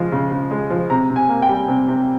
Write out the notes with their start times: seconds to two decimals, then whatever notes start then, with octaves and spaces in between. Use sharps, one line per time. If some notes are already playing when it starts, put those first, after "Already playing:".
Already playing: C#3 F3 G#3
0.12 C#3
0.31 C#3
0.51 G#3
0.70 F3
0.90 C3 A#5
1.10 C3
1.16 G#5
1.29 A#3
1.42 G5
1.49 G3
1.68 C3
1.88 C3